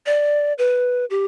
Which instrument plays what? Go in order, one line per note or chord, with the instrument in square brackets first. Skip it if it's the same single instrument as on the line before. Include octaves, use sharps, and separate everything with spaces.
[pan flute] D5
B4
G4